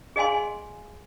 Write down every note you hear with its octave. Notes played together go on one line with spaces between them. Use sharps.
G#4 D#5 F5 G#5 C6